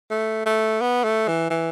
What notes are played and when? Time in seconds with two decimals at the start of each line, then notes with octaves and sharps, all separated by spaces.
0.11 A3
0.46 A3
0.81 B3
1.04 A3
1.28 E3
1.50 E3